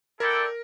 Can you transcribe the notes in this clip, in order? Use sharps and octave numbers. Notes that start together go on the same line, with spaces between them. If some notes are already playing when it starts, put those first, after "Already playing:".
E4 A4 A#4 D5 G5